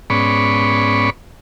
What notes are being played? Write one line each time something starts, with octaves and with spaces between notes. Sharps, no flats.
G#2 B3 C#4 D5 B5 C#6